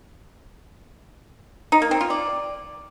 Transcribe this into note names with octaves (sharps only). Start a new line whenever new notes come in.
D#4
A#3
C4
F4
D5